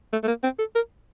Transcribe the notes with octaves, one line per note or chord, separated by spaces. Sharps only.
A3
A3
A#3
C4
A4
A#4